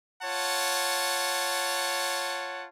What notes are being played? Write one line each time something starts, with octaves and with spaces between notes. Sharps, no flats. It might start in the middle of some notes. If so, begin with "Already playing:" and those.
F4 C#5 F#5 A5